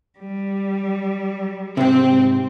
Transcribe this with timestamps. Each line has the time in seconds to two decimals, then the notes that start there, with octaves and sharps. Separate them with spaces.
0.18 G3
1.77 G#2 C3 C4